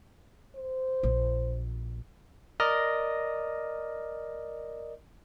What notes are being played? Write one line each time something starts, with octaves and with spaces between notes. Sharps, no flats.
C5
A#1
A#4 D5 D#5 F6 A#6